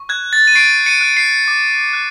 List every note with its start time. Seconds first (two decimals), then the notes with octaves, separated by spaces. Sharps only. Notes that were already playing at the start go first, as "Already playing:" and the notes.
Already playing: C#6
0.09 F#6 G#6
0.33 A6
0.47 D#7
0.55 C#6 C7 D7
0.86 C#7 D#7
1.01 F#6
1.17 C7 D7
1.48 D6
1.93 F#6